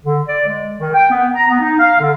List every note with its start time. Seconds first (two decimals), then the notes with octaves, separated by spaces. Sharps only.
0.03 D3
0.26 D5
0.48 G#3
0.79 D#3
0.94 G5
1.10 B3
1.35 A#5
1.48 B3
1.60 D#4
1.79 F5
2.00 D3